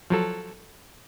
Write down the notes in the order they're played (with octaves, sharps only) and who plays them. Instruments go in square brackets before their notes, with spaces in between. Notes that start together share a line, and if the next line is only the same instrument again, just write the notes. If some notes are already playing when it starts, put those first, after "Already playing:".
[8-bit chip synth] F3 F#3 A4